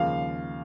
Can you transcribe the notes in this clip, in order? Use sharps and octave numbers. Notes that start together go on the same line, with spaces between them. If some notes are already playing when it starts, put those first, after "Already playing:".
Already playing: D#2 C#3 F3 G#3 F5